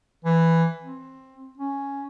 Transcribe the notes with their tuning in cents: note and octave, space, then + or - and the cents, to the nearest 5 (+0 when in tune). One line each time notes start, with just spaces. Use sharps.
E3 +5
C4 +10
C#4 +0